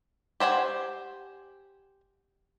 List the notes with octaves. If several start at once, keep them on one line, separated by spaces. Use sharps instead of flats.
G4 C5 F#5 G#5